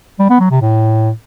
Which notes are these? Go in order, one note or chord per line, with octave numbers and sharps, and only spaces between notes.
G3
B3
F#3
C3
A2